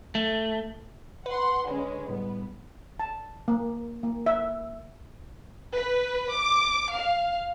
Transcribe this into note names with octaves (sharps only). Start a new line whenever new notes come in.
A3
B4 F#5 C6
D3 G#3 C#4
A2 G3 B3
A5
A#3
A#3
E5
B4
D6
F5